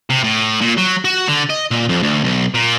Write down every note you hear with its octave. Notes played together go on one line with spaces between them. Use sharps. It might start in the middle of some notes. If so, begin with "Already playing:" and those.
C3
A2
A#2
F#3
F#4
D3
D#5
A#2
F2
D2
B1
A#2